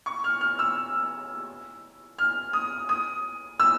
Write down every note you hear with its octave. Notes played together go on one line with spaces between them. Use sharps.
C#6
F6
F6
E6
F6
D#6
D#6
E6